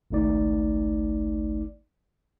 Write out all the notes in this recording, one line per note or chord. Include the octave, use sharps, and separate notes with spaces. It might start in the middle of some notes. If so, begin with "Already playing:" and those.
G#1 C#2 A3 D#4 D5